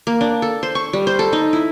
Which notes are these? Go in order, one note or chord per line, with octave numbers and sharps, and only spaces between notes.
A#3
D4
A4
C5
C#6
G3
C5
A4
D#4
E4